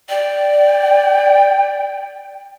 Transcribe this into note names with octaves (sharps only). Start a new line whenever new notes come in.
D5 G5